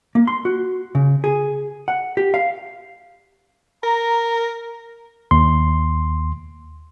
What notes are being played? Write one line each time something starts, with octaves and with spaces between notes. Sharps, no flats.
A#3
C6
F#4
C#3
G#4
F#5
G4
F5
A#4 A#5
D#2 C6